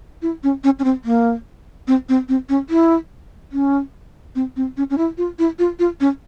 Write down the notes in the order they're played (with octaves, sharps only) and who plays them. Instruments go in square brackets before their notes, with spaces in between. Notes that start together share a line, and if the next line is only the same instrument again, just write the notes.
[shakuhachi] E4
C#4
C#4
C#4
C4
A#3
C4
C4
C4
C#4
E4
C#4
C4
C4
C#4
C#4
E4
F4
E4
F4
F4
C#4